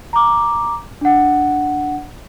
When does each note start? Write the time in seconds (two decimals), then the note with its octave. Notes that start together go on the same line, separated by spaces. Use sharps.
0.13 A#5 D6
1.01 D4 F#5